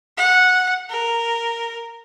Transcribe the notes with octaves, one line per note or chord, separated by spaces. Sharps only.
F#5
A#4